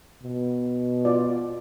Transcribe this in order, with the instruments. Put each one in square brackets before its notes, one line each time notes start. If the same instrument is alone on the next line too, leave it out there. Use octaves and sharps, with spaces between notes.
[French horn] B2
[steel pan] F4 D5